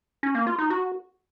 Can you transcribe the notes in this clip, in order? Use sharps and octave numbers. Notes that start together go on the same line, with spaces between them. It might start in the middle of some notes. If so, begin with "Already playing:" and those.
C#4
A#3
F4
D#4
F#4